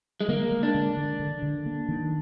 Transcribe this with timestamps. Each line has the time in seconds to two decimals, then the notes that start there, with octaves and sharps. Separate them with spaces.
0.21 G#3
0.28 D3 A#3
0.51 G#3
0.63 D4
0.75 D3
0.97 D3
1.20 D3
1.43 D3
1.66 A#3
1.89 D#3